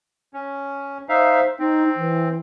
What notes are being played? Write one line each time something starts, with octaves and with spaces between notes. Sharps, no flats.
C#4
D#4 C5 E5 F5
C4 D#4
E3